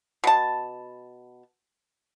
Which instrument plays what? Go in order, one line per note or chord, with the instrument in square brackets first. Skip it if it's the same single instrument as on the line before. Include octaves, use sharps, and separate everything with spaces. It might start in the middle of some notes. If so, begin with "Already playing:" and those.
[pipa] B2 A5